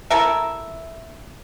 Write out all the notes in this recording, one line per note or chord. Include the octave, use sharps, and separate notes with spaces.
E4 A4 A#4 E5